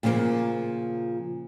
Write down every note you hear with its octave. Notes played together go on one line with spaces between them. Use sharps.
A#2 C#3 F3 A3 A#3